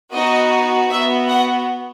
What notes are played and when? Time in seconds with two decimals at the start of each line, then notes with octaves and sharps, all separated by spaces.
0.12 B3 D#4 F#4 D#5
0.90 B3 F#4 E5
1.29 F#5